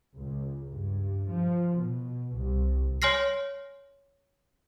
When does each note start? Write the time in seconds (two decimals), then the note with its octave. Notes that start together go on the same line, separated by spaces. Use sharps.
0.16 C#2
0.71 G2
1.29 F3
1.75 B2
2.34 C2
3.02 C#5 G#5 C6 F6 A#6 C7